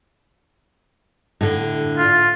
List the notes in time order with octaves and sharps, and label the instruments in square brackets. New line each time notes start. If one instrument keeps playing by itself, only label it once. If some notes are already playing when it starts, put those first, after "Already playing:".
[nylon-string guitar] A2 D3
[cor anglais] F4